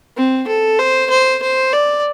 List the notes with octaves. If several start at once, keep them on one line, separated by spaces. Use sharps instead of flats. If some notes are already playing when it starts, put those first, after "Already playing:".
C4
A4
C5
C5
C5
D5